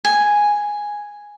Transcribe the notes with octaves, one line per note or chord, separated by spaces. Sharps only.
G#5